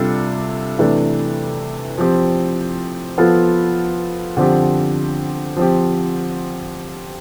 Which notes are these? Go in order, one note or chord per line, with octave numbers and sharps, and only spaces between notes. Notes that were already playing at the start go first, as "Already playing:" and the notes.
Already playing: C3 G3 D4 F4 A4
C3 E3 A3 D4
F3 C4 G4
F3 B3 F4 A4
D3 F3 C4 G4
F3 C4 G4